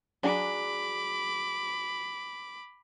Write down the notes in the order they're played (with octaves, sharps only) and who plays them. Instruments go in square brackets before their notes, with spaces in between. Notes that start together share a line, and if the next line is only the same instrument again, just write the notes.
[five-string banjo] F#3 D4 G#4 [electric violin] B5 D6